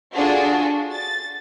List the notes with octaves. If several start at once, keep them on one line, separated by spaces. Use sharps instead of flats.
D4 F4 F#4 G#4 A4
A6